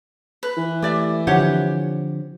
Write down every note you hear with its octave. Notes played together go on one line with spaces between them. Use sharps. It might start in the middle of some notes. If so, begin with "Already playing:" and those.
B4
E3
A3 G4 D5 E5
D3 F3 C4 G4 C#5 F#5